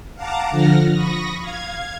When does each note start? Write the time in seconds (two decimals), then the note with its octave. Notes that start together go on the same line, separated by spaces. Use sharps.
0.15 F5 F#5 A5 A#5 D6
0.51 D3 F3 F#5 F6 A#6
0.92 B5 C#6 D#6 A#6
1.40 F5 G#6